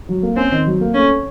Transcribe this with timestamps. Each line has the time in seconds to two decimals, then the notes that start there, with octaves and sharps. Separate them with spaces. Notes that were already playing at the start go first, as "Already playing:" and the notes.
0.09 F#3
0.23 A#3
0.37 C4 C#4
0.52 D#3
0.66 F#3
0.81 A#3
0.95 A3 C#4